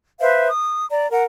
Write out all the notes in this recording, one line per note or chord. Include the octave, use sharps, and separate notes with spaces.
B4 C5 E5 F5
D#6
D5 A#5
A#4 F#5